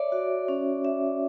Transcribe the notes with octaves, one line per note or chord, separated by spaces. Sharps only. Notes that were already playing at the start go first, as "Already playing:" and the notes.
Already playing: C#5 D5 E5
F#4
C#4
E5